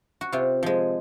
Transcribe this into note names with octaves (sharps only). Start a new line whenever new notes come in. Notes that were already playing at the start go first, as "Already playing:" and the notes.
F#4
C3 F4
F3 G#3